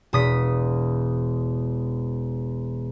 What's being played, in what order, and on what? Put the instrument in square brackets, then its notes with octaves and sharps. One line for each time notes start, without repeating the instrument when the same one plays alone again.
[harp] E1 D#6 B6